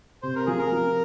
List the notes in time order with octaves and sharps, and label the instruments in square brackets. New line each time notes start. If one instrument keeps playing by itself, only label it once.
[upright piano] C3 [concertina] C5
[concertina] A#4
[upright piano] F3 [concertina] G#4
[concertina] A#4
[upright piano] F3